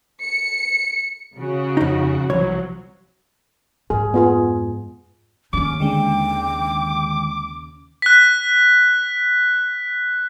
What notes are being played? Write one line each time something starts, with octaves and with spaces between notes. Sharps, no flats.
C#7
C#3 F#4
F2 D#4
C2 F3 F#3 C#5
F2 G#2 G#4
B3 F4 G#4
D#2 C#3 C#4 D6
D3 D#3 G#3 G5
F#6 B6